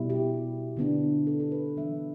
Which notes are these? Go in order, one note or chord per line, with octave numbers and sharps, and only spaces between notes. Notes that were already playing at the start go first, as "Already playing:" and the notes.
Already playing: B2 G3 E4
G4
D3 B3 D4
A4
A4
B4
E3 G3 B3 D4 E5